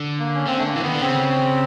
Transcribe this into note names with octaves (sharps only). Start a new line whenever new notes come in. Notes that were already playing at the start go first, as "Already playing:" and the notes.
Already playing: D3
A#3
C#4
D3 C4
A3
A#3
E3
D#3 B3
D3
C#3 C4